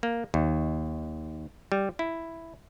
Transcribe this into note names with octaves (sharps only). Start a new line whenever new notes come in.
A#3
D#2
G3
E4